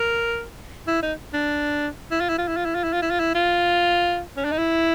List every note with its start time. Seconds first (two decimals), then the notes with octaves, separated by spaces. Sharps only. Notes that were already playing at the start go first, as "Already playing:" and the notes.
Already playing: A#4
0.87 E4
1.02 D#4
1.33 D4
2.11 E4
2.20 F4
2.29 E4
2.38 F4
2.48 E4
2.57 F4
2.65 E4
2.75 F4
2.83 E4
2.93 F4
3.02 E4
3.10 F4
3.20 E4
3.35 F4
4.37 C#4
4.44 D4
4.52 D#4
4.58 E4